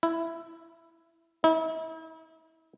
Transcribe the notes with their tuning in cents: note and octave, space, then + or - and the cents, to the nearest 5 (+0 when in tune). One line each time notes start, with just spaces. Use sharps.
E4 +10
E4 -40